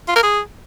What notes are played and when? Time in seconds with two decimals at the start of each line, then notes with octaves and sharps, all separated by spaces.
0.08 F4
0.16 A#4
0.23 G#4